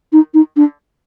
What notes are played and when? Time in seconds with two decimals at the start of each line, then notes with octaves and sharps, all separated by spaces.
0.12 D#4
0.34 D#4
0.56 D4